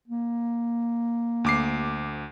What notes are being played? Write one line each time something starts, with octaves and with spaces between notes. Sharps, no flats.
A#3
D2 D6 C7